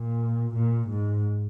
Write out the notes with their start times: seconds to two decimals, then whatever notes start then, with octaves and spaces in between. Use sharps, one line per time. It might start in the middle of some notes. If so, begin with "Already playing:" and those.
Already playing: A#2
0.55 A#2
0.89 G#2